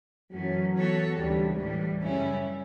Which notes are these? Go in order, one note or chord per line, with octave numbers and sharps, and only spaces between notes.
F#2 E3 F#3 A3 C#4
E3 B3 F#4 A4 C#5
D2 C#3 E3 G3
A2 E3 G3
F#2 C#3 G3 C#4 E4